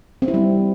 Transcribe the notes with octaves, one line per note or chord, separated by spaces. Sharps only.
C4
E4
G3